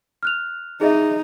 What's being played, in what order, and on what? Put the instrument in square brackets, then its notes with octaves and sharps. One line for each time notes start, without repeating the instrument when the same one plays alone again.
[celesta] F6 F#6 F7
[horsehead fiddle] D#4 [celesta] G#4 D#5 E5